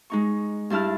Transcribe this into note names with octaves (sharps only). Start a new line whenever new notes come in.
G#3 D#4 C#6
G2 D4 E4 A5 F6